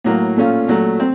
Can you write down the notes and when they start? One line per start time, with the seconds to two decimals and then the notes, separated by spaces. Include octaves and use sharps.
0.04 A2 F#3 A#3
0.36 A#2 A3 C#4 F4
0.68 A#2 F#3 A3
1.00 C4